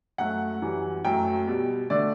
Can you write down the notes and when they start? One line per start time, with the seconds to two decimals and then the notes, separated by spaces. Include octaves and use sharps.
0.18 F#2 F#3 A3 F#5
0.62 F#2 E3 G3
1.05 F#2 F#3 A3 G5
1.47 B2 G3
1.90 D3 A3 D5